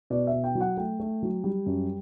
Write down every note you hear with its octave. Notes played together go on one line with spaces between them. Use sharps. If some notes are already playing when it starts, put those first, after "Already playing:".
B2 D5
E5
B2
G5
F#3
F#5
A3 G5
A3
F#3
G3
F#2